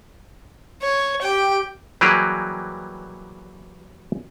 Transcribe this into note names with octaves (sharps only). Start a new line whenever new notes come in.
C#5
G4 G5
E3 F#3 G3 A#3 G4 G#4